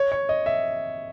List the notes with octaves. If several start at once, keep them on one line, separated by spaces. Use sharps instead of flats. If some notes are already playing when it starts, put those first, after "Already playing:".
Already playing: C#5
C#5
D#5
E5